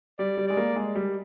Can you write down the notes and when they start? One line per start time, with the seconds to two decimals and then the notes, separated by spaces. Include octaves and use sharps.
0.19 G3 D5
0.37 G3
0.47 G#3 D5
0.57 A#3
0.76 G#3
0.95 G3